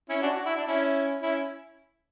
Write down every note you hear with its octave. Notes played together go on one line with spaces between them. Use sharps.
C#4 E4
D4 F#4
F#4
E4
D4
C#4 E4
C#4 E4